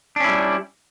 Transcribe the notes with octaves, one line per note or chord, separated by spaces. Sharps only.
G3 C#4 D4 E4